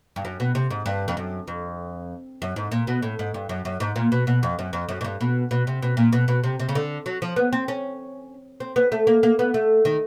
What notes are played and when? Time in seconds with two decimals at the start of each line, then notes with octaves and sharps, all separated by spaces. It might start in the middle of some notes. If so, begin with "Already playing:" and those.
0.16 G2
0.25 F#2
0.40 B2
0.55 C3
0.71 G#2
0.86 G2
1.08 F2
1.17 F#2
1.48 F2
2.42 F#2
2.56 G#2
2.72 A#2
2.87 B2
3.02 A2
3.19 G#2
3.34 G2
3.49 F#2
3.65 F#2
3.80 G#2
3.96 A#2
4.12 B2
4.27 B2
4.43 F2
4.59 F#2
4.73 F2
4.89 F#2
5.01 G#2
5.04 G2
5.21 B2
5.51 B2
5.67 C3
5.82 B2
5.97 A#2
6.13 B2
6.28 B2
6.44 C3
6.60 C3
6.69 C#3
6.75 D3
7.06 F#3
7.22 F3
7.36 B3
7.53 C4
7.68 C#4
8.60 C4
8.76 B3
8.92 A3
9.07 A#3
9.23 A#3
9.39 B3
9.54 A3
9.85 D#3